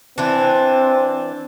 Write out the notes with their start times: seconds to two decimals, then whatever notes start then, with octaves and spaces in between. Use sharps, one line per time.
0.18 E3 C4 D4